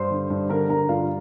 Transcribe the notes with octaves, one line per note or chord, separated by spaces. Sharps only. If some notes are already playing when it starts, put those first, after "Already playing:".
Already playing: G2 C5 C6
D3
G2
D3 A#4 A#5
D3 A#4 A#5
G2 F4 F5